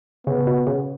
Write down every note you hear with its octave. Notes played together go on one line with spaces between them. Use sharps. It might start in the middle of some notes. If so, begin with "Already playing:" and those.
C#3 B3
B2
C#3